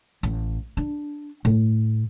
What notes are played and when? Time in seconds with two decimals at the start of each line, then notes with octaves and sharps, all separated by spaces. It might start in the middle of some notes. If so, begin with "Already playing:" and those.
0.23 A1
0.77 D4
1.45 A2